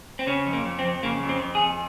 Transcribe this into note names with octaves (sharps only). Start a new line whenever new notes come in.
C4
C#3 C#4
F2
A#3
F2
C4
F2
C#3 A#3
F2
C4
F2
G#4
F2